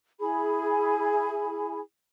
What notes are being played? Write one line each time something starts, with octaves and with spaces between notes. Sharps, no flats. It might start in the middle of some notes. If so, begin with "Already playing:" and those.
E4 G#4 G#5 B5